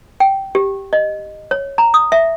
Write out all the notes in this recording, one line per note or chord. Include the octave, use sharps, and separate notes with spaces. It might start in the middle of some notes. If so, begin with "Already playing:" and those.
G5
G4
D#5
C#5
A#5
D#6
E5